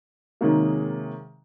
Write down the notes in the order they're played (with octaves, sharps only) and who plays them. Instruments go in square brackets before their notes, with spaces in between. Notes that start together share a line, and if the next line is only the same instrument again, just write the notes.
[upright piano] C3 D#3 F#3 G#3 A#3 G#4